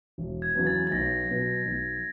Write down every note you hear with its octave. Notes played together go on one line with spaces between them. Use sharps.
E1
G#6
E2 C#3 F#3 B3
A6
A6
B1 A#6
B2 F#3 B3
B1